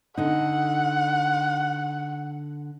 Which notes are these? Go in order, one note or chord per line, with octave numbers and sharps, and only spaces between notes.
D3 D#4 F#5